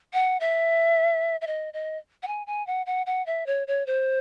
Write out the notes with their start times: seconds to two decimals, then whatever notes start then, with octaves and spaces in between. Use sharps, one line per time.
0.13 F#5
0.40 E5
1.41 E5
1.47 D#5
1.74 D#5
2.23 F#5
2.27 G#5
2.47 G#5
2.67 F#5
2.86 F#5
3.06 F#5
3.26 E5
3.47 C#5
3.67 C#5
3.87 C5